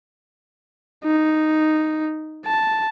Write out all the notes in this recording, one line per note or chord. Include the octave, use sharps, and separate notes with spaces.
D#4
A5